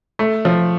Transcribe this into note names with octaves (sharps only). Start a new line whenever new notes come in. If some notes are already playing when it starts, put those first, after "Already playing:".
A3
F3